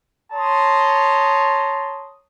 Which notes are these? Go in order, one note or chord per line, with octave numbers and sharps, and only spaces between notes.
C#5 A5 A#5 C6 D#6